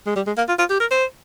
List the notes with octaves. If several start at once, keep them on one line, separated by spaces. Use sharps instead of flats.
G#3
G3
G#3
A#3
F4
F4
G4
A#4
C5